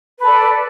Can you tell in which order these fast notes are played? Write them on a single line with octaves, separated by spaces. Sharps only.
B4 A4 D5